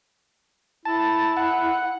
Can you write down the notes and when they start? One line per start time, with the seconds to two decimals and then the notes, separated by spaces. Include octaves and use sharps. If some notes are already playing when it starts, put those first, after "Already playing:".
0.85 E4 A5
1.37 F#5